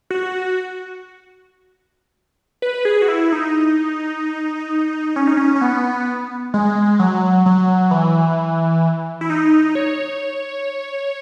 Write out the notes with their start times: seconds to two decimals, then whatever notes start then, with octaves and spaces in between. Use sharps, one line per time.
0.10 F#4
2.62 B4
2.85 G#4
3.02 F#4
3.08 E4
3.32 D#4
5.16 C#4
5.27 D#4
5.37 C#4
5.56 C#4
5.61 B3
6.54 G#3
6.99 F#3
7.46 F#3
7.91 E3
9.21 E4
9.30 D#4
9.75 C#5